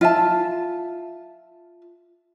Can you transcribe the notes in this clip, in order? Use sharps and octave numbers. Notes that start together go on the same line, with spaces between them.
F4 E5 A5